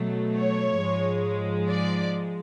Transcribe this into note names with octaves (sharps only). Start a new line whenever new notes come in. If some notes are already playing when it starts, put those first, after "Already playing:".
Already playing: B2 F#3 A3
C#5
G#2 F3 G#3
D5